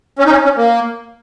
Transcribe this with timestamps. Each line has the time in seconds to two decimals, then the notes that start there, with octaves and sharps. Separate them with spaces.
0.19 C#4
0.26 D#4
0.31 C#4
0.44 C#4
0.57 A#3